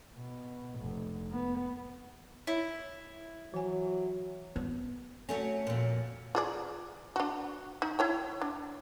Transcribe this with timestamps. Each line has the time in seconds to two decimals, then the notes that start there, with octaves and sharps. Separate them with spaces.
0.16 B2
0.80 F1
1.31 B3
2.47 E4 C#5 E5
3.54 E3 F#3 G#5
4.56 B3
5.29 F#3 A3 C#4
5.67 F2 A#2
6.35 F4 G#4 D5
7.16 D4 F#4
7.82 D#4
7.99 E4 C#5 G5
8.41 D4